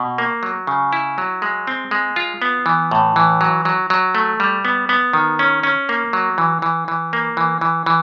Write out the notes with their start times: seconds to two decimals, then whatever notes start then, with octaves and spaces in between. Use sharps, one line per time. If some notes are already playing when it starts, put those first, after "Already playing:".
Already playing: B2
0.18 A#3
0.43 F#3
0.67 C#3
0.93 E4
1.18 F#3
1.42 G#3
1.67 C4
1.91 G#3
2.16 F4
2.42 B3
2.66 E3
2.91 A2
3.16 E3
3.41 F#3
3.65 F#3
3.90 F#3
4.15 A3
4.40 G3
4.65 B3
4.89 B3
5.13 D#3
5.39 C#4
5.63 C#4
5.89 A#3
6.13 F#3
6.38 E3
6.62 E3
6.88 E3
7.13 A#3
7.37 E3
7.61 E3
7.86 E3